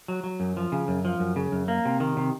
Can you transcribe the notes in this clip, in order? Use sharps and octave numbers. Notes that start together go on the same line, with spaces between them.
F#3
F#3
F#2
F3
C#3
F#2
F3
F#2
C#3
F#2
A#3
C3
D#3
C3